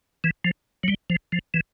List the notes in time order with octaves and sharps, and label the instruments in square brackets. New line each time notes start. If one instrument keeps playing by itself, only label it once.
[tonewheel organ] E3
F3
F#3
G3
F3
F3
E3